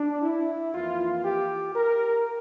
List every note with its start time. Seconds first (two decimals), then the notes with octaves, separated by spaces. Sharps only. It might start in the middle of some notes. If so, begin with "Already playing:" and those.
Already playing: D4
0.22 E4
0.74 F2 E3 A#3 F4
1.25 G4
1.76 A#4